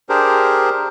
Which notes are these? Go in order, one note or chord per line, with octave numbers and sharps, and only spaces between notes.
D4 G4 G#4 A#4 C5